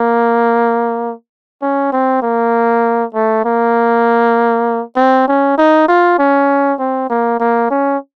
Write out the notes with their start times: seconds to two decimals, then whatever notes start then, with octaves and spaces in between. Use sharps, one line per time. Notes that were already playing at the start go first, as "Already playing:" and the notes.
Already playing: A#3
1.62 C#4
1.93 C4
2.22 A#3
3.14 A3
3.45 A#3
4.97 C4
5.28 C#4
5.58 D#4
5.88 F4
6.19 C#4
6.79 C4
7.10 A#3
7.40 A#3
7.70 C#4